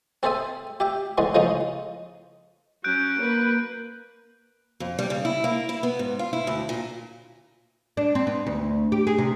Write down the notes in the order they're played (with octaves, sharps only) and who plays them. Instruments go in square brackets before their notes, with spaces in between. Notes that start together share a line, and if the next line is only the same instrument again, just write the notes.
[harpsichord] C4 G#4 A4 C5 E5 G#5
G4 E5 G5
D3 E3 G#3 B3
C#3 F3 G#3 A3 C#4 D#4
[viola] F#3 C#4 [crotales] F#6 G6 D7
[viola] A#3 B4
[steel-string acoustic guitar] F2
G3
C#3
E4
A#3
E4
B3
G#2
F4
E4
D2
A#2
[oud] D4
C4
B3
D2
G4
G#4
C3